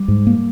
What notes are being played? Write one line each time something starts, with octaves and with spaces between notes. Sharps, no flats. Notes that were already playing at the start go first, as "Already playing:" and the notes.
Already playing: G3
G#2
A#3